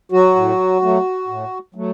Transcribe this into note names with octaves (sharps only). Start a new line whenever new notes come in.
F#3 F#4
A2
F#3 A3
A2
F#3 A3